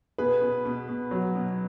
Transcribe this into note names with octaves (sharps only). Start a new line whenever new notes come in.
B2 G#4 B4
B2
B2
B2
F#3
B2